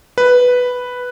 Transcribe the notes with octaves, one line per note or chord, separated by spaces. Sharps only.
B4